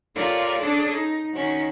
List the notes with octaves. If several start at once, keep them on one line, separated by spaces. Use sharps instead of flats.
F4 G4 A4 A#4 C#5 D5
C#4 D4 G#4 A4
D#4
D#3 C#4 F#4